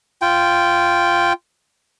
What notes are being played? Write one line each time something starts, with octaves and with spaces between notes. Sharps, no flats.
F4 G5